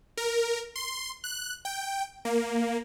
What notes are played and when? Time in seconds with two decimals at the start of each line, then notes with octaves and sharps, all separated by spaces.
0.17 A#4
0.76 C6
1.24 F#6
1.65 G5
2.25 A#3